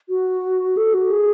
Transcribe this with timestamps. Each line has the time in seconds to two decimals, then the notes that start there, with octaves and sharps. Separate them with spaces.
0.09 F#4
0.77 A4
0.94 F#4
1.11 G#4